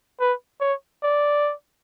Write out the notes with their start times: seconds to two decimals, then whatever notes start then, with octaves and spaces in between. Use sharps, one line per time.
0.20 B4
0.61 C#5
1.03 D5